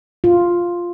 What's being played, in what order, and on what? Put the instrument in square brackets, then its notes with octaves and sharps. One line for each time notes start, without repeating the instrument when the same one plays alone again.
[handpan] F4